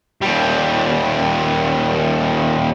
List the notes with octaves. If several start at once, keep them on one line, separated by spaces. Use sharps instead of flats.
D#2 G3